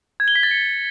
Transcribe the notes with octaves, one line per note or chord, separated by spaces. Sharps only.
G#6
G7
B6
A6
C#7